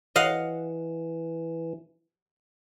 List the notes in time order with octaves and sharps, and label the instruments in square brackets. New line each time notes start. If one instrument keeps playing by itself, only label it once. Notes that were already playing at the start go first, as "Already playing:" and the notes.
[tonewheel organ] E3 [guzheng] D#5 F5 F#5